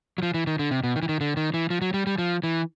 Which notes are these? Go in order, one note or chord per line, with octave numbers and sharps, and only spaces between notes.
F#3
F3
E3
D#3
D3
C3
B2
D#3
E3
D#3
D3
D#3
E3
F3
F#3
G3
G3
F3
E3